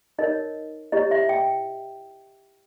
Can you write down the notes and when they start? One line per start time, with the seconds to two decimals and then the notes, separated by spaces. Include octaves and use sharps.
0.19 D#4 A#4 C#5 D#5
0.92 E4 G4 C#5 D#5
1.11 E5
1.29 G5